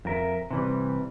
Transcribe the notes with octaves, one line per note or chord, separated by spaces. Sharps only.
F2 A#4 E5
C3 E3 G3